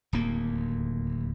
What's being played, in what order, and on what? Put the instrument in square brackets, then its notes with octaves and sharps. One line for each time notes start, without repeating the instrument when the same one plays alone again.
[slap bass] D1 D#2 A#3